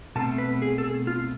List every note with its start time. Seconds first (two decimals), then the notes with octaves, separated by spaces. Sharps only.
0.16 B2 A3 C4 A5
0.38 B4
0.62 G#4
0.78 A4
0.84 G#4
1.07 F4